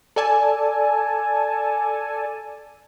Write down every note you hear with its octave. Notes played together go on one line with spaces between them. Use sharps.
A4 D5 G#5 A5